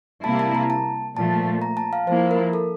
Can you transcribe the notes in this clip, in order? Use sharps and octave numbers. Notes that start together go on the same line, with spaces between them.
C3 G3 A#3 E4 A5
A5
A#5
A5
A#2 F3 A3 A5
A#5
A5
F5
F3 A#3 E4 C5
A#4
A4